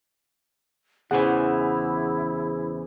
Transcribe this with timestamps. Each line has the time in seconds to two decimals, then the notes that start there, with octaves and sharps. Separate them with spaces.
1.11 E2 C#3 E3 E4 G#4 C5 F#5